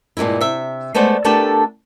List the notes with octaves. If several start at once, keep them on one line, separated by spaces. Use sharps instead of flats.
G2 A#2 C#3 G#3 E4
C3 E5
G#3 A3 B3 C5 D5 F#5
A3 B3 D4 G4 A4 A#4